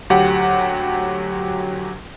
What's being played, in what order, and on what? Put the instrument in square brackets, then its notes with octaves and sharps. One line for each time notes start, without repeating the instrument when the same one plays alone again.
[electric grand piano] D2 F#3 G4 F#5